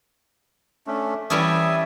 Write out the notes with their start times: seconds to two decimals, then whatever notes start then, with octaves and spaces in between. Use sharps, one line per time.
0.87 A3 C#4 D4
1.30 E3 G3 C#4 E5 A5 D#6